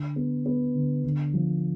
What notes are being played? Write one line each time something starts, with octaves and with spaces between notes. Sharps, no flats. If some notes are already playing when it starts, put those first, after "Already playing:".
Already playing: D3
B3
B3
D3
D3
F3